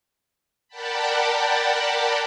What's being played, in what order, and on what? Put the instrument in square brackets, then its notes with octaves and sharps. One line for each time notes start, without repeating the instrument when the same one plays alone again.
[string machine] A#4 D5 F#5 G5 A5 B5